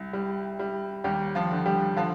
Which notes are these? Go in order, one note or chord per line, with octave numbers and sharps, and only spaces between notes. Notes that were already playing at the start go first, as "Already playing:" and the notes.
Already playing: C2
G3
G3
D#2 G3 G4
F3 F4
D3
G3 G4
D3 F3 F4